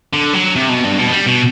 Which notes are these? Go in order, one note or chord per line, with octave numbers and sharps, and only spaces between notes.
D3
F#3
C3
B2
G2
B2
G3
B2